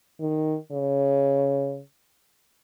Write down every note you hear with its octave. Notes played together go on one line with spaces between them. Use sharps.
D#3
C#3